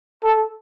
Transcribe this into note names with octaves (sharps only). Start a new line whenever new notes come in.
A4